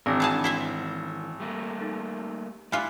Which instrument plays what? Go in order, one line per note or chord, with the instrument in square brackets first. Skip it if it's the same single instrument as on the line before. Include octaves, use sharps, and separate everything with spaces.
[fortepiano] G#1 [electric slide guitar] G#2 D#3 E3 [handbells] D4 D6 A#6
[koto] D4 G#4 A5 [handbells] F#5 B5
[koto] E4 C5 E5
[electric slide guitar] G3 A3 A#3
[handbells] D#4 A4
[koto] G3 F4 [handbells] A3 G#5 F#6 [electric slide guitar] E4